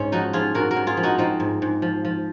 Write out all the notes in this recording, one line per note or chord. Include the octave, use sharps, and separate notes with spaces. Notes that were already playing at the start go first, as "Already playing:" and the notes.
Already playing: G#2 C#4
F3 D#4 F#4
F3 F4 G#4
G#2 F#4 A#4
F#4 A#4
G#2
F4 G#4
F3
D#4 F#4
F3 C4 D#4
G#2
G#2
F3
F3